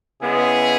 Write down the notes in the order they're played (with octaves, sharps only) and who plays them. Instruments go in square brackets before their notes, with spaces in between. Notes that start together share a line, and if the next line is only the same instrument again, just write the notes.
[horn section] C#3 G#3 B3 E4 G#4